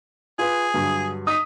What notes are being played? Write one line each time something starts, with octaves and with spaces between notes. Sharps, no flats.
F4 G#4 B4
G2 D3 F#3
D#4 D#6 B6